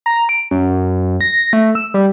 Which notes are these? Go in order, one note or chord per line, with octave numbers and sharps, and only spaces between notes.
A#5
D7
F#2
A#6
A3
E6
G3